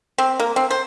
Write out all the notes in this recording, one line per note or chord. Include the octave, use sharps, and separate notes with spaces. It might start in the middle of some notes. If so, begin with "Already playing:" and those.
C4
A#3
C4
C5